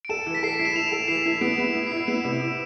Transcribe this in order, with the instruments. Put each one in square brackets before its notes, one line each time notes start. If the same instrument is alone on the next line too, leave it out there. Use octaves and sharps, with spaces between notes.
[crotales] D7
[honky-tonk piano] A4 [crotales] E7
[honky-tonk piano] E3
[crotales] B6
[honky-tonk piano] A4 [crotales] C7
[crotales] D7
[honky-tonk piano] E4
[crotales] E7
[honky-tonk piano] E4 [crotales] F7
[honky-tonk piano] A4
[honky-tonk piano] E3 [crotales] C7
[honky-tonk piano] E4
[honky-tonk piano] B3 [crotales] D7
[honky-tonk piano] B3
E4
[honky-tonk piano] E4 [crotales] C7
[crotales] D7
[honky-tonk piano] B3 [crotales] E7
[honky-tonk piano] C3
E4